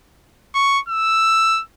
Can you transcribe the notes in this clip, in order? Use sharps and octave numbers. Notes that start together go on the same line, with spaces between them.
C#6
E6